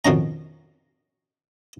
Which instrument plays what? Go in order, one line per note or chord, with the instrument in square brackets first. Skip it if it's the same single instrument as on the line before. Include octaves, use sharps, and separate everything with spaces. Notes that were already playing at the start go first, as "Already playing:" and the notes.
[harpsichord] F2 B2 D#3 C#4 A#5